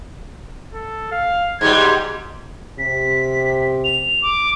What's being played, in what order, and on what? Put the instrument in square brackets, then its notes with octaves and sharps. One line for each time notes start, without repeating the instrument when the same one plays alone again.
[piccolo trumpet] A4
F5
[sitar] G#2 B2 G3 [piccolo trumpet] G#6
[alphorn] C3 [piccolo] B6
[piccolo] F7
D6